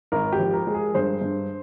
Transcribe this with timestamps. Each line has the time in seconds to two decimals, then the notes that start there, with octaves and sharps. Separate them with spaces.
0.12 G#1 A#4
0.32 G4
0.39 F3
0.53 A#4
0.67 G#3
0.74 G#4
0.95 G2 C5
1.21 G2